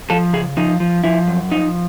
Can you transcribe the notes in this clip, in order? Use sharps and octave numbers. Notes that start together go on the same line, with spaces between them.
F3 A4
C#3 G#4
F3 D#4
F3
F3 E4
F#2
F3 D#4